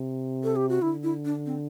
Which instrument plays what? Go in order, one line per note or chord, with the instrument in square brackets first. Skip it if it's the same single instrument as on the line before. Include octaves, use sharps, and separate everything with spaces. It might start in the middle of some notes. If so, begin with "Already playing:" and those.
Already playing: [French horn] C3
[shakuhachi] A4
G4
F#4
[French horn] D3 [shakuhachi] E4
[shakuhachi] E4
D4
C4